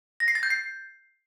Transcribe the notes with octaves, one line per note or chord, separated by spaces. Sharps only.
A#6
C7
A6
G6
C7